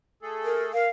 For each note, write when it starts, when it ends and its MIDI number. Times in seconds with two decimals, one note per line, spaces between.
0.22 0.72 57
0.22 0.72 68
0.22 0.72 69
0.45 0.63 70
0.73 0.86 70
0.73 0.89 77